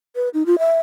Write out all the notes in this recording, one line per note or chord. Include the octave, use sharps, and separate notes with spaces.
B4
D#4
F4
E5